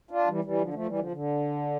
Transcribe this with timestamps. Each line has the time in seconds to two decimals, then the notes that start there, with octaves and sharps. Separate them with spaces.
0.11 D4 F4
0.28 E3 G3
0.44 E3 G3
0.61 D3 F3
0.74 F3 A3
0.87 E3 G3
0.99 D3 F3
1.12 D3